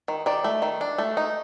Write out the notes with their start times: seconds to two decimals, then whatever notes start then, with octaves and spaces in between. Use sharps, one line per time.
0.08 D#3
0.26 D#3 D5
0.44 A3
0.62 D#3
0.81 D4
0.98 A3
1.17 D#4